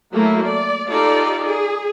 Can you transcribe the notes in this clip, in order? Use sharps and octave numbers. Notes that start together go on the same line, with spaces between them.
F#3 A3 A#3 E4
D5
D#4 F4 G4 A4 D5
G#4